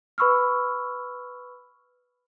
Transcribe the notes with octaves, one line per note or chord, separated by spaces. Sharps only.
B4 B5 C#6 E6 F6